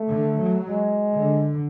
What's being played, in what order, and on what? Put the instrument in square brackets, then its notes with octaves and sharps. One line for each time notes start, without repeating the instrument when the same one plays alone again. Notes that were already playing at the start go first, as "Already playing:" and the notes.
Already playing: [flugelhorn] A3
[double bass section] D3
F#3
[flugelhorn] G#3
[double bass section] D3